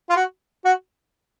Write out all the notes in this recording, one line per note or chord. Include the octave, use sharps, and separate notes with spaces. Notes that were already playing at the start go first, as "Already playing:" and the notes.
F4
F#4
F#4